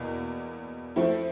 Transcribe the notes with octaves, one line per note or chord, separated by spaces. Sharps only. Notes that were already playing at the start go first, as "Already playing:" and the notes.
Already playing: E2 B2 A#3
F3 A3 C4 E4